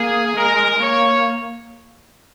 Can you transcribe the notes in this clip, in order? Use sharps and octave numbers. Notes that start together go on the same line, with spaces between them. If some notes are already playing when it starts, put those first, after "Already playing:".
Already playing: A#3 G#4
G#3 A#4
A#3 C#5